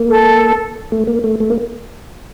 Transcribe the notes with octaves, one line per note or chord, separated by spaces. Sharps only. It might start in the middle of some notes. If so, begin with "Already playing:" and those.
Already playing: A#3
A4
A3
A#3
A3
A3
A#3